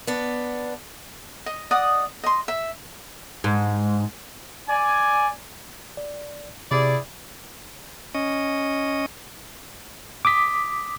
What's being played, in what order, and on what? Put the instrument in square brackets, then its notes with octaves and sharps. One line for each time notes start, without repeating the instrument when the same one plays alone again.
[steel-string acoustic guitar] B3 D4
[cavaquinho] D#5
D5 D#5 F#5 D#6
D#5 C6
E5
[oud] G#2
[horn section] D5 G#5
[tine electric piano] D5
[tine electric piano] C3 [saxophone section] E4 G#4 D5
[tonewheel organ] C#4 D#5
[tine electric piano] D6 D#6 B6